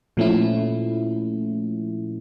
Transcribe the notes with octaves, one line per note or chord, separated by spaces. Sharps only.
A#2 F3 A3 C#4 E4